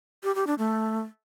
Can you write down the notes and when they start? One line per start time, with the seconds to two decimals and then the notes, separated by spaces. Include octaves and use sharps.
0.24 G4
0.35 G4
0.47 D4
0.59 A3